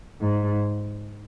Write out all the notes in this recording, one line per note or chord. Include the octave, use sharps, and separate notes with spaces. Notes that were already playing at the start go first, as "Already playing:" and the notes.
G#2